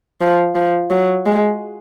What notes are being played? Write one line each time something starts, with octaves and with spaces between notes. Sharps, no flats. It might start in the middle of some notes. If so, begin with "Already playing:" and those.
F3
F3
F#3
G#3